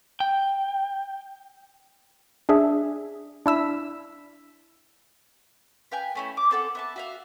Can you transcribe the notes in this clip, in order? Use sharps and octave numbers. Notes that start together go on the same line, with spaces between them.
G5
D4 G#4 E5
D4 E4 E6 B6
B4 F5 G5 G#5
A3 C#4 E4
D6
C4 A4 F#5
B3 E5 A5
F#4 E5 F5